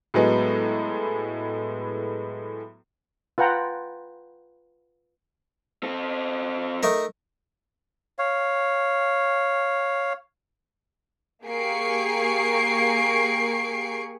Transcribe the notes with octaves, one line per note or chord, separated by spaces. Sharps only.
A2 F#3 G#3 B3
F4 B4 F#5 G5 A#5
C4 A4
A3 D#4 A#4
C#5 F5
A#3 G4 G#4 C#6 C7 D7